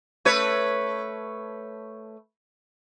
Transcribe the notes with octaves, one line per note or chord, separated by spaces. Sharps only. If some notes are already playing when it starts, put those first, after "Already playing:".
A3 B4 C#5